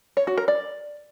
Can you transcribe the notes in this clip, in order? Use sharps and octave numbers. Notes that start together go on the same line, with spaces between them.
C#5
F#4
A#4
D5